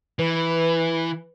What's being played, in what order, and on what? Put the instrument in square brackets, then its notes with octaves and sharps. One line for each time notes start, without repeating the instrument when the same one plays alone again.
[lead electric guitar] E3 [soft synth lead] B4